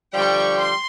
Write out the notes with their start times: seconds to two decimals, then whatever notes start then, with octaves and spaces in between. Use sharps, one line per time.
0.14 D3 F3 G3 G5 C#6
0.58 C6